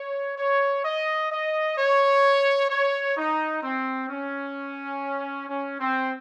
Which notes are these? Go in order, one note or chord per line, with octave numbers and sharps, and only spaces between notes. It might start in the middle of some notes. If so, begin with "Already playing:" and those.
Already playing: C#5
C#5
D#5
D#5
C#5
C#5
D#4
C4
C#4
C#4
C4